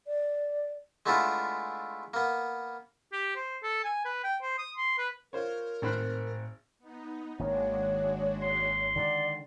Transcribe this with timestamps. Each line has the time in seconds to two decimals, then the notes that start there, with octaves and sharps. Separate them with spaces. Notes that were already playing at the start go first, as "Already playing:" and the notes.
0.07 D5
1.06 G#3 A3 B3 D4 E4 F4
2.14 A#3 B3
3.13 G4
3.36 C5
3.63 A4
3.84 G#5
4.05 B4
4.24 G5
4.42 C5
4.58 D#6
4.77 C6
4.98 B4
5.33 F4 A#4 C5 C#5
5.82 G#1 A2 C4 C5 B5 F#6
6.79 B3 D#4
7.39 G#1 D#3 G#3 A#3 D4 F#4 C#5
8.42 C6
8.96 D3 D#3 G#3 D5